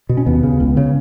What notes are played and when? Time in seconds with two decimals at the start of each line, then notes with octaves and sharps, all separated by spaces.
0.09 B2
0.17 C#4
0.26 D#2 B3
0.43 C#3
0.60 C#2
0.77 C#3